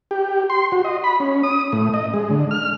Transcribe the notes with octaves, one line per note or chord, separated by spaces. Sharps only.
G4
C6
F#4
D#5
B5
C#4
D#6
A2
D#5
G#3
D3
F6